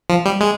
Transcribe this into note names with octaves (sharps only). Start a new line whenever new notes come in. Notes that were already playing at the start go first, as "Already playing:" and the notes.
F3
G3
G#3